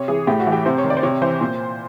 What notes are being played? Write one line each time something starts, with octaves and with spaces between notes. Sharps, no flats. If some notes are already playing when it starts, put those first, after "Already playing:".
Already playing: C3 C#5
E3 G#4
A2 G4
F#4
E3
G4
C3 C5
C#5
D#3
D5
C5
C3 C#5
E3 C5
A#2